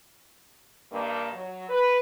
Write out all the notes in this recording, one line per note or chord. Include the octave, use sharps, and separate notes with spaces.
G2 D#3 A#3
F#3
B4